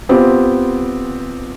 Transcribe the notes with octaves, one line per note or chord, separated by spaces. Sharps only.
B3 C4 F4 G4